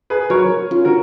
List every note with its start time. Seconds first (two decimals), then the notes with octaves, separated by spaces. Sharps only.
0.10 G#4 B4
0.30 F#3 A#4 C#5
0.71 C#4 F4
0.85 F#4 A#4